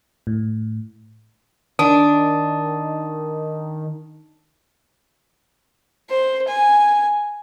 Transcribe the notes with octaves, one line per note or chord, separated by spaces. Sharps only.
A2
D#3 D4 D#6
C5
G#5